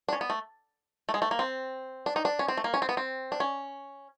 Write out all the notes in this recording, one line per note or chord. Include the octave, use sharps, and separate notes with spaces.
D4
C#4
B3
A3
A3
G#3
A3
A#3
C4
D4
D#4
D4
C#4
C4
A3
A#3
C#4
C4
B3
C4
D4
C#4